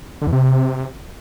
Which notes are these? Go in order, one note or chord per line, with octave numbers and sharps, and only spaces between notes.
D3
E2
C3